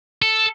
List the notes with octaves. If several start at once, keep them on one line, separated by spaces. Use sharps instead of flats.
A4